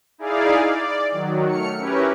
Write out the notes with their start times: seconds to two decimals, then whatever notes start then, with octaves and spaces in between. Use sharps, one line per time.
0.18 D#4 E4 G#4 D5 F5
0.63 D5
1.11 D#3 F#3
1.47 A3 F6 C#7
1.78 C#4 E4 G4 A#4 B4 C#5